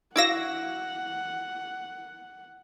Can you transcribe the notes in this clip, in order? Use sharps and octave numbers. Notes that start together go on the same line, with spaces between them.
E4 F#4 F5 F#5 D6 E6 A#6